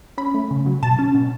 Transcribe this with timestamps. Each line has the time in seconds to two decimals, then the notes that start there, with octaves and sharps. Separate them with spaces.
0.18 C#4 B5
0.34 A3
0.51 C#3
0.66 F#3
0.83 B2 A5
0.99 C#4
1.15 B2